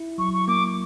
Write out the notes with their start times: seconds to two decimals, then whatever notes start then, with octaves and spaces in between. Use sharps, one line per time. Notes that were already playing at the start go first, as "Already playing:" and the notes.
Already playing: E4
0.18 F#3 C#6
0.33 C#6
0.48 A#3 D6